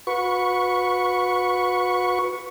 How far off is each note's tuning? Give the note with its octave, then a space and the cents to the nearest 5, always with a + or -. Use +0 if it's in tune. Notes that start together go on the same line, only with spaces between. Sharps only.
F#4 -35 B4 +0 C#6 +0